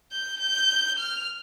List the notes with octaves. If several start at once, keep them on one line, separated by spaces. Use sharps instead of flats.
G6
G6
F6